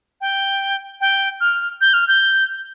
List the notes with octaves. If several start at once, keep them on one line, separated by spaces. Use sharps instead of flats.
G5
G5
F6
G6
F6
G6